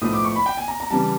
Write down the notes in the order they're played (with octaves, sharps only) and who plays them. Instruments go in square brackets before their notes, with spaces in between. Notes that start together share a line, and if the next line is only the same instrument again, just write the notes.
[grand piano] B1 A2 F3 A3 D#6
D6
C#6
B5
G5
G#5
A#5
A#5
C#3 E3 G3 A5